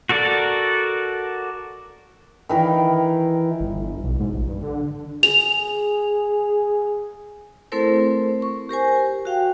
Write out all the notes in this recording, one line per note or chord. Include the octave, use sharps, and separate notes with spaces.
F#4 A4 A#4 D5
D#3 E3 A#4
G1
B1
G#2
A#1
G2
D3
G#4 F7
A3 C4 E4 A4 A#4 C5
C#6
G4 A#4 C5 G#5
F#4 F5 G5